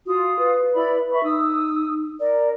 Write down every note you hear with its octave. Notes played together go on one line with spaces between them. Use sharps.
F4 F#4 D#6
B4
E4 D5 B5
E5 B5 C#6
D#4 D#6 E6
A#4 D5